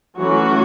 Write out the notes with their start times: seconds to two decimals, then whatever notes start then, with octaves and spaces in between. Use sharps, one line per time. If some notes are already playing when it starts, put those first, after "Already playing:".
0.18 E3 F#3 A3 C#4 F#4